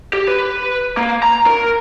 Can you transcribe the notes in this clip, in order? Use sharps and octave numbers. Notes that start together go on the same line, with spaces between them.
G4
B4
A#3
A#5
A#4